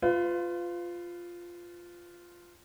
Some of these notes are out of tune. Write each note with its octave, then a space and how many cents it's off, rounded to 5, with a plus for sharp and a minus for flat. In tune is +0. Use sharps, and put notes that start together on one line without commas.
F4 +0 B4 +35